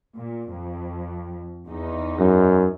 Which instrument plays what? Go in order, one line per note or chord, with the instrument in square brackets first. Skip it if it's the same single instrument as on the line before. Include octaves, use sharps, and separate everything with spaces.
[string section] A#2
F2
E2 D#4
[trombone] F#2